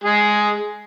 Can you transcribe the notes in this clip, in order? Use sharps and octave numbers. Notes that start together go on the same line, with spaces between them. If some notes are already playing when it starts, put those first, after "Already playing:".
G#3 G#4